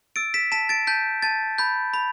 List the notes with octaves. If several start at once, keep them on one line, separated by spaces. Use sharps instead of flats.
E6 A6 D7
B6 E7
A5 B6 E7
A6 D7
A5 G6 B6
A5 A6
B5 G6
B5